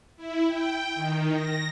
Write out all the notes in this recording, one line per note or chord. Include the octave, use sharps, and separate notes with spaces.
E4
G5
D#3
A#6